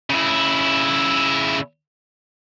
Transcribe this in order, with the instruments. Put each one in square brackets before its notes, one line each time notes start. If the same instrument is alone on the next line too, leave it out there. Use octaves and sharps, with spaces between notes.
[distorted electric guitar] C#3 E4